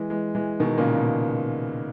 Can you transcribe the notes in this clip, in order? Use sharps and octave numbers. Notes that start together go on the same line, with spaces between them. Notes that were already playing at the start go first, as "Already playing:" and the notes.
Already playing: E3 G#3
E3 G#3
E3 G#3
B2 D#3
A#2 C#3
B2